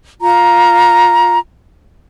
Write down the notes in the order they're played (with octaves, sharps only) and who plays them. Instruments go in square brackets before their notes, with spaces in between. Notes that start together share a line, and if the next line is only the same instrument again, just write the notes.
[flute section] F4 A#5